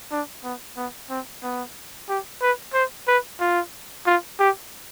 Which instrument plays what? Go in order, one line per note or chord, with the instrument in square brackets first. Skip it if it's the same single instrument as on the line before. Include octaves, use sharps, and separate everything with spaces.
[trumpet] D4
B3
B3
C4
B3
G4
B4
C5
B4
F4
F4
G4